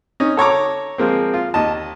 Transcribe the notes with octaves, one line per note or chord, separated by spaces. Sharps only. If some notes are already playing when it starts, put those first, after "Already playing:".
C#4 D#4
A4 C#5 A#5 D6
F3 G#3 A#3 C4
F4
D#2 D#5 A5